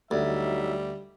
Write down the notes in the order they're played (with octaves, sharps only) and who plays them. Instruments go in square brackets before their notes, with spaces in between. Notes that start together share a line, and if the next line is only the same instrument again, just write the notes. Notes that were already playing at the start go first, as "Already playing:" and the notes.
[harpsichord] D2 [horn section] F#3 D#4 E5 [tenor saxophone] G3